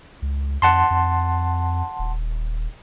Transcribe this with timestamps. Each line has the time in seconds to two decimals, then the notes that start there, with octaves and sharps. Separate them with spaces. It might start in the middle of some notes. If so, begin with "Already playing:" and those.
0.22 C#2
0.62 F2 F#5 A5 C6
0.90 F2
1.99 D#1